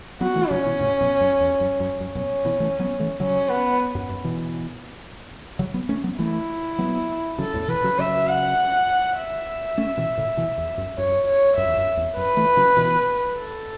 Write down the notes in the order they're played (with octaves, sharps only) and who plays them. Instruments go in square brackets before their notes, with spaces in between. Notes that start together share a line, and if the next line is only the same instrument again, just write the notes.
[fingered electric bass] F#3 B3 [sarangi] F#4
[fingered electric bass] E3 A3
[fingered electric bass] C#3 F#3 [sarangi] C#4
[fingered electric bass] B2 E3
A2 C#3
F#2 B2
F#2
E2
F#2
F#2
[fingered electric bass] F#2 [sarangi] C#4
[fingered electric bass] F#2 B2
B2 E3
E3 A3
F#3 B3
E3 A3
[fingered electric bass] C#3 F#3 [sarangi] C#4
[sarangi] B3
[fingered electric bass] F#2
F#2
B2 E3
C#3 F#3
F#3 B3
A3 C#4
F#3 B3
[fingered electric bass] E3 A3 [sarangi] E4
[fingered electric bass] F#3 B3
[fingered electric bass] C#3 F#3 [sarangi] A4
[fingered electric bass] E2 A2
[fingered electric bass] B2 E3 [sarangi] B4
[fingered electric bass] C#3 F#3
[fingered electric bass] C#3 F#3 [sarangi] E5
[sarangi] F#5
E5
[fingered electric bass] A3 C#4
B2 E3
A2 C#3
B2 E3
E2
F#2
[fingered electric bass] F#2 [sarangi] C#5
[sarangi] C#5
[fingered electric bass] F#2 [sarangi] E5
[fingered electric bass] E2
F#2
E2
[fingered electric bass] F#2 [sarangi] B4
[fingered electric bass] E3 A3
C#3 F#3
B2 E3
[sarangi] A4